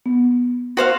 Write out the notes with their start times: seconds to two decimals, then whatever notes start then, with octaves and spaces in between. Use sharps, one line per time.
0.06 B3
0.77 F#4 C5 F5